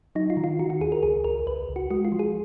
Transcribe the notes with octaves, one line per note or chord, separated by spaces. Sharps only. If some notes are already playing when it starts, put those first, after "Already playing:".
F#3 D#4
F4
D#3
F4
D#3 F#4
F#4
D#2 G#4
A#4
C#2 G#4
C#2 A#4
C#2 B4
C#2
F#4
G#3 F#4
F4
F3
G#4